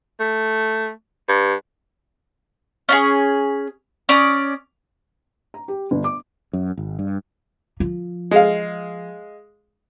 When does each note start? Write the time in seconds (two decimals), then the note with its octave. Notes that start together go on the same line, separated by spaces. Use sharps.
0.20 A3
1.29 G2
2.89 C#4 F4 G#4
4.09 C#4 D5 D#6
5.54 A#5
5.68 G4
5.91 G1
6.04 D6
6.53 F#2
6.77 G#1
6.99 G2
7.80 F3
8.31 G#3 F5